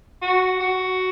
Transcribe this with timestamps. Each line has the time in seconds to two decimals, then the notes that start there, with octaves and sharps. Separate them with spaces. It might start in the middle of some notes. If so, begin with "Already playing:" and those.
0.22 F#4
0.60 F#4